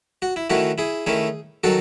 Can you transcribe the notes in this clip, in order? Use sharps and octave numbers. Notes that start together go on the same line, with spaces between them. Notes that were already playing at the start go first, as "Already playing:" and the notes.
F#4
E4
D#3 A3 C#4 E4 F#4
E4 G#4
D#3 A3 C#4 E4
D#3 F#3 F#4 A4